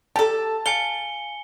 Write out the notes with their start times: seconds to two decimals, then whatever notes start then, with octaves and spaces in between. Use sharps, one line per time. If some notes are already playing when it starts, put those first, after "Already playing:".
0.16 G4 A4 A5
0.66 F5 G#5 C#7 G7